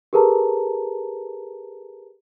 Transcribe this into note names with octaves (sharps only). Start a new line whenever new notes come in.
G4 G#4 A#4 B4 A5 A#5